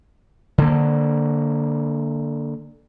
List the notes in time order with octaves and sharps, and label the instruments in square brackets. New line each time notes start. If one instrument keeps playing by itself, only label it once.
[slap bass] D3 A#3